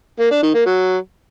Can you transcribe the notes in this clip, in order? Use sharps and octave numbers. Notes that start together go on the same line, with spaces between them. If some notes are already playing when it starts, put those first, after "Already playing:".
A#3
D4
D#3
A#3
F#3